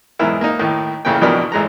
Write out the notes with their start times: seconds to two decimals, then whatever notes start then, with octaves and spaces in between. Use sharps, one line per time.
0.19 B1 E2 G#2 E4 A#4
0.41 A#3 D#4
0.59 D#2 A2 D#3
1.05 A1 C#3 A#3 G5
1.21 A1 F2 B2 D4 A#4 B5
1.52 A1 G#3 A#5